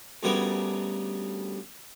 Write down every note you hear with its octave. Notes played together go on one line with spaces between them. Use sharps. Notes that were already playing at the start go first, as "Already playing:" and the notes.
D2 C#3 G3 B3 A#4 G#5